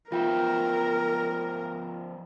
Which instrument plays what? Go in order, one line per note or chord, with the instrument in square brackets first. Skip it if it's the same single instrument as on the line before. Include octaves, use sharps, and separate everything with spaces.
[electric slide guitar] F3 B3 E5 [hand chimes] F4 G5 [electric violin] A#4